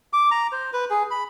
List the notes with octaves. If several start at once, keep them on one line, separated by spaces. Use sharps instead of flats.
D6
A#5
C5
B4
G#4
B5